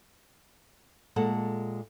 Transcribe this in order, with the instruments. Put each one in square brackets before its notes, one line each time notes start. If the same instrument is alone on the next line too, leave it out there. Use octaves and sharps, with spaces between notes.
[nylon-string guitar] A#2 G#3 A4 F#5 A5